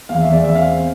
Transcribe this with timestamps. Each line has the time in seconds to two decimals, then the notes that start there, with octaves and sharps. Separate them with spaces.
0.09 E2 F5
0.21 E2 E5
0.33 D5
0.40 E2 E5
0.55 C4 F5
0.72 C4